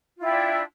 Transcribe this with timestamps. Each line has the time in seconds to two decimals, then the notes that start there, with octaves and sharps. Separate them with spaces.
0.16 F4
0.21 E4
0.25 G5
0.29 D4